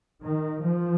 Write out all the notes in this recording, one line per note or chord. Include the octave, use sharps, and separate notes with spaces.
D#3
F3